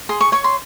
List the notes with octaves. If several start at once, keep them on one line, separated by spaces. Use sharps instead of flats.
G#4 C6
C#6
C#5 C#6
C6